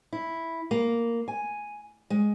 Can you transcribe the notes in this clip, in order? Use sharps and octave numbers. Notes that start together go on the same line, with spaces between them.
E4
A#3
G#5
G#3